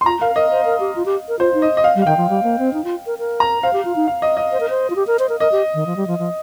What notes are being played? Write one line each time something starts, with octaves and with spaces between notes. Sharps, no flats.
C6
F4 A#5
A#4 F5
A#4 D#5
C5
A#4
G4
F4
G4
A#4
F4 C5
D#4
D#5
D#5
F5
G3
F5
D#3 G5
F3
G3
A#3
C4
D#4
F4
A#4
A#4
A#5
C5 F5
G4
F4
D#4
F5
D#5
D#5
C5
A#4
C5
F4
G4
A#4
C5
A#4
A#4 D#5
G4
D#3
F3
G3
F3
F3